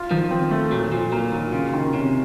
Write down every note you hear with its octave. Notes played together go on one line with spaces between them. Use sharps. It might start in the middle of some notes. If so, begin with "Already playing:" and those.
Already playing: F4
D#3 F3
C4
A3
A#2 F#3
A#2 F3
F#3 A#3
D#3 F#3
C#3 F4
D#3
C3 C#4